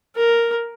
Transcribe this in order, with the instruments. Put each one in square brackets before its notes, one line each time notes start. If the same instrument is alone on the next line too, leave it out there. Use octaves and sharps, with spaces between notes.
[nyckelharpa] A#4